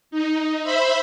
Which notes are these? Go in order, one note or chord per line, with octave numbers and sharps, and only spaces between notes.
D#4
C5 E5 B5